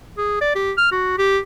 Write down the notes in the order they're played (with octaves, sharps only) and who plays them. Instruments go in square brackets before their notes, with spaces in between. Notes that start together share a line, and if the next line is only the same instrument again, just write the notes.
[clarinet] G#4
D5
G4
F6
F#4
G4